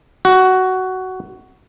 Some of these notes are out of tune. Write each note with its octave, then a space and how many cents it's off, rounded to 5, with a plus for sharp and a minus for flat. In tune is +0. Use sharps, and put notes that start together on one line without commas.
F#4 +10